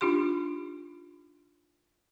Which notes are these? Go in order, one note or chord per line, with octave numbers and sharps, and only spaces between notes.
D4 D#4 F4 G4 C6